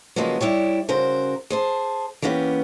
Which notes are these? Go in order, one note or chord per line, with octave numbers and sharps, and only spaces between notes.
C#3 F3 F#3 G#3 A#3 B3
G3 E4 G4 C#5
C#3 F#4 A#4 C5
G#4 C5 A5
E3 A#3 B3 C#4 G4